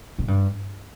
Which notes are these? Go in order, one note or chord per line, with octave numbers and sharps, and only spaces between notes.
G#2
G2